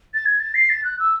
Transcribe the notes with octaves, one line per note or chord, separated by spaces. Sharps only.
A6
G#6
A6
C7
A6
F#6
E6